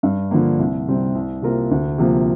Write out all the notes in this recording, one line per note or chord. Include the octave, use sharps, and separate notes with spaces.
G2
D3 F3 A#3
C2
C3 G3 C4
C2
C3 A#3 F4 A#4
D2
C3 F3 A#3